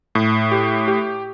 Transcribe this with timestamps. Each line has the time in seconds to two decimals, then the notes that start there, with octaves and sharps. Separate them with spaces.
0.15 A2
0.52 G4
0.88 G4